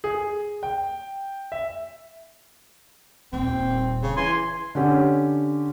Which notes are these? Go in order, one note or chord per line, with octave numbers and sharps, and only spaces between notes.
G#4
G5
E5
D#1 A#2 C4
C#3
E3 G#5 C6
D3 C#4 G4